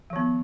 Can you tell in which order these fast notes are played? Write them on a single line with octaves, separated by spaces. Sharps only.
F3 D#3 B3